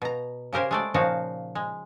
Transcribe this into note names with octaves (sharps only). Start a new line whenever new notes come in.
B2 A#5
C#3 G4 A#4 C5 G#5
G#3 A3 D5
A#2 C#3 F3 D#4 F#4 F5
G#3